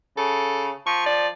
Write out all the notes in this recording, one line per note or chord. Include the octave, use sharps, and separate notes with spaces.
C#3 A4
F3 C#6
D5